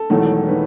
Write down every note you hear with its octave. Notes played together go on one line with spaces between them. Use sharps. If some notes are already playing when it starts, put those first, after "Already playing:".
Already playing: A4
E1 E2 D#3 F#3 A3
D#3 F#3 B4